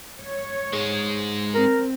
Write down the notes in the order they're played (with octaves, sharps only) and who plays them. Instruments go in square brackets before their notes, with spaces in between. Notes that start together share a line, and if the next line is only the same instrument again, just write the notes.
[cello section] C#5
[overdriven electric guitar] G#2 G#3
[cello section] C4 [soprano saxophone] A#4